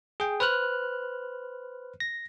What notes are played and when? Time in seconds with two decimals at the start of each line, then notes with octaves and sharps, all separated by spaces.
0.20 G#4 G5
0.40 B4 C5 F6 F#6
2.00 A#6